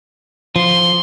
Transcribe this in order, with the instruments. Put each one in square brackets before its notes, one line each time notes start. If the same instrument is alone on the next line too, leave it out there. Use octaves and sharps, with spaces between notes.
[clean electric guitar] F3 [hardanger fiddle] C6